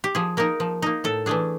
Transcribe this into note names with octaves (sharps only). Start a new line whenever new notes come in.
G4
F3 G#4
A#3 D#4 A#4
F3
A#3 D#4
A2 A4
E3 A3 D4 G#4